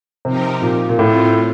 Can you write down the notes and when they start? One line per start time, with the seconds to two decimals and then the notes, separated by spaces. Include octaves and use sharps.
0.25 C3 F3 C4 D#4 G4 A#4
0.62 A#2
0.89 A#2
0.99 A2 A3 C4 F4